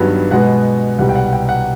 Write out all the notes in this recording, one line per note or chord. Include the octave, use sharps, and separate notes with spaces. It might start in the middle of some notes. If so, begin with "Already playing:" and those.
Already playing: G2 D#3 F#3 B3
B2 G#3 B3 F#5
C2 B2 G3 F#5
G5
F#5
G5
F#5